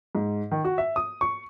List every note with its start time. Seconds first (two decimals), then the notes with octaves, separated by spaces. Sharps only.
0.15 G#2
0.51 D#3
0.64 F#4
0.78 E5
0.96 D#6
1.21 C#6